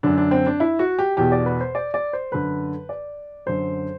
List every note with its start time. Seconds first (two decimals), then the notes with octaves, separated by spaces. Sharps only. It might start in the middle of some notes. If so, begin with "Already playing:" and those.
0.03 F#2 D3 D4
0.18 D4
0.31 C4
0.46 D4
0.60 E4
0.79 F#4
0.99 G4
1.17 E2 B2 G4
1.32 D5
1.46 B4
1.61 C5
1.75 D5
1.94 D5
2.13 C5
2.32 F#2 D3 B4
2.89 D5
3.46 F#2 D3 C5